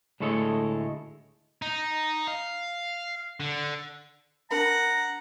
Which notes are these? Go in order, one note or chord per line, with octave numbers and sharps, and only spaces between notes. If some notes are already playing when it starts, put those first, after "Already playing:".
D2 A2 G#3 A4 C#5 D#5
D#4
F5
D3
D4 A#4 F#5 A#5 B5